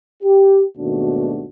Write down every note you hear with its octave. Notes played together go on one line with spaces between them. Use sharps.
G4
G#1 D#2 B2 A3 D4 F#4